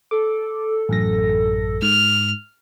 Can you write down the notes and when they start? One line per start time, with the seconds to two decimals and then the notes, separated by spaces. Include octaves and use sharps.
0.11 A4 D6
0.89 A1 F#2 A#6
1.82 G#2 F6